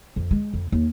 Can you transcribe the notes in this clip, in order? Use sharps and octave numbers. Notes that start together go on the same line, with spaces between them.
F2
G#3
F2
D#2